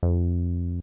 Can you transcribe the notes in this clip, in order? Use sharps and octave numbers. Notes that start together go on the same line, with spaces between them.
F2